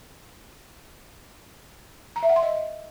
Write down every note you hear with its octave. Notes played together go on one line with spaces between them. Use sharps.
A#5
E5
F#5
C6
D#5